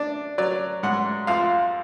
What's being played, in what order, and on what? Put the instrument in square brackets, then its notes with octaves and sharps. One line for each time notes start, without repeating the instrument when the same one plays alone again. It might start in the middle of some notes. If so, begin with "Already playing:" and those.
Already playing: [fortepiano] D4
F#3 D5
G#2 F#5
F2 F5